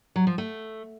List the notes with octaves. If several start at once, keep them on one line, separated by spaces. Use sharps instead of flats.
F#3
F3
A3